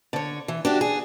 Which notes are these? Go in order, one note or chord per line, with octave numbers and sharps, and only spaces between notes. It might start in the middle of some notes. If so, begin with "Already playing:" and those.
D3 C#5
E3
D4 F#4 G4
G#4